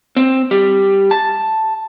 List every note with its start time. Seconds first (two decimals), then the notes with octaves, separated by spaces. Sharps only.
0.17 C4
0.51 G3
1.11 A5